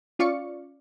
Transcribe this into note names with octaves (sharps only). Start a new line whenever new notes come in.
C#4 F4 D5 F5 C#6 C#7